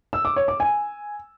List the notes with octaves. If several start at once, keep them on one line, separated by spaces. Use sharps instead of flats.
E6
D6
C#5
D6
G#5